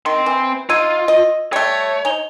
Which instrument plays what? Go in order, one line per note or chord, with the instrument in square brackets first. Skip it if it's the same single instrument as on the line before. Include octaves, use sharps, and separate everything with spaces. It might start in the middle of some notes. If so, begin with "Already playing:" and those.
[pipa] D#3 [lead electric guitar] C4 C6
[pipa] E3
[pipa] D#4 [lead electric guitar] F4 [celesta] E6 G#6 D#7
[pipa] D#5
[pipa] G3 A3 [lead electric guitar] C#5
[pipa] D#4 [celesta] G#5 F7 G7